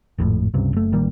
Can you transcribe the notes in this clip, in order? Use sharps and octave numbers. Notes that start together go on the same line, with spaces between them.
G#1 F2 A2
C#2 G2 C3
F#1 A3
A1 D#3 G3 A#3